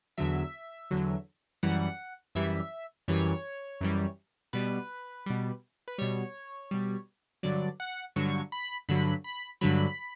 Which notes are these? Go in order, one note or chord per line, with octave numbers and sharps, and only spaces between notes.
E2 D3 F#3 E5
E2 D3 F#3
F#2 E3 G3 F#5
F#2 E3 G3 E5
F#2 E3 G3 C#5
F#2 E3 G3
B2 G3 B4
B2 G3
B4
B2 G3 C#5
B2 G3
G2 D3 F#3 D5
F#5
G2 D3 F#3 C#6
B5
G2 D3 F#3 B5
B5
G2 D3 F#3 B5